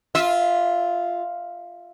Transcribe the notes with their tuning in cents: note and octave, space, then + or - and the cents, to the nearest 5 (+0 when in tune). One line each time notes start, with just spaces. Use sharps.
F4 +0 E5 -20